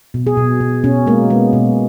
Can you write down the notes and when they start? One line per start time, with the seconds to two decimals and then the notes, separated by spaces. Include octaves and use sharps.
0.14 B2
0.27 G#4
0.37 B2
0.60 B2
0.84 B2 C#4
1.07 G#3 A#3
1.30 G#3 B3
1.53 B2